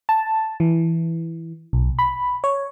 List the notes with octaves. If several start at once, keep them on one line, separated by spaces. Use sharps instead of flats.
A5
E3
B1
B5
C#5